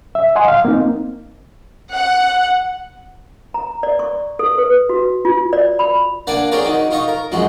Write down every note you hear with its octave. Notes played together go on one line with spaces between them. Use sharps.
E5
D#5 F#5 G#5 C6
F5
A#3 C4 D#4
F#5
A#5
D5
C#6
A4
B4
F#4
F4
D5
B5
A#3 D4 D5 F#5 G#5
C4 D4 G#4 A#4 C#5 D5
D#3 F#4
D#4 F4 D#5 C#6
A#4
F#2 F3 G#3 F#4